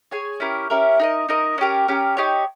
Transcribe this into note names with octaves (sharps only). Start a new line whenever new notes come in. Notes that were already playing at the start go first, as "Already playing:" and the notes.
G#4 C#5 G#5
C#4 E4 G4 A#4
C#4 E4 G4 A#4
D#4 A#4 D#5
D#4 A#4 D#5
C#4 G4 A#4
C#4 G4 A#4
D#4 G4 C#5